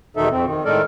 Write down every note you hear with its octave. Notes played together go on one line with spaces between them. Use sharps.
E2 B2 D#3 D#4 A4 E5
F2 C4
D#3
A2 D#3 G#3 A4 A#4 D5